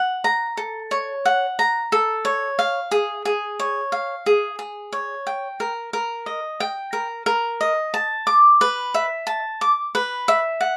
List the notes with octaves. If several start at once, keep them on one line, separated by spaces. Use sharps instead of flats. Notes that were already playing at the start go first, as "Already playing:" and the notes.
Already playing: F#5
A#5
A4
C#5
F#5
A#5
A4
C#5
F5
G#4
G#4
C#5
F5
G#4
G#4
C#5
G5
A#4
A#4
D#5
G5
A#4
A#4
D#5
A5
D6
B4
E5
A5
D6
B4
E5
F#5